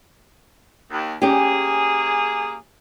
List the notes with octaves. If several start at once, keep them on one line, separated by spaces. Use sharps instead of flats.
D#2
A#3 C#4 G4 G#4